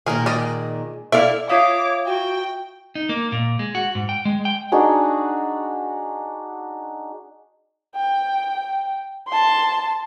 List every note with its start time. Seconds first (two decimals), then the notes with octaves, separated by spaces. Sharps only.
0.06 A#2 D#3 G#4 A#4
0.26 G#3 D5 D#5
1.12 E4 A4 D5 E5 F5
1.50 F4 C#5 E5 F5 D6 D#6 C7
2.06 F#4 G5
2.95 D#4
3.09 A#3
3.32 A#2
3.59 G#3
3.75 F#4
3.95 G#2
4.09 G5
4.25 G#3
4.45 G5
4.72 D4 D#4 F#4 G#4
7.96 G5
9.28 A5 C6